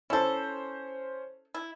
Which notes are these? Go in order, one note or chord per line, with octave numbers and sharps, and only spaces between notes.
C#4 E4 A4 C5
E4